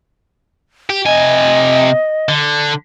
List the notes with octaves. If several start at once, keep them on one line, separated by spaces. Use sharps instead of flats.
G4
C3 D#5 G#5
D3